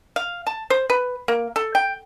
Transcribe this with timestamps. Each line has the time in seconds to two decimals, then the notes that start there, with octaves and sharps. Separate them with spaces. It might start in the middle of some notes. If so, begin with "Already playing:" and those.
0.16 F5
0.47 A5
0.70 C5
0.90 B4
1.28 A#3
1.56 A4
1.75 G5